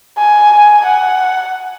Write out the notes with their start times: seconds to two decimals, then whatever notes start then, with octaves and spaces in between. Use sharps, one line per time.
0.18 G#5
0.85 F#5